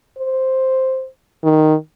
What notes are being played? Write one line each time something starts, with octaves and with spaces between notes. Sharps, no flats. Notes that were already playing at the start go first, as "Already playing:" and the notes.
C5
D#3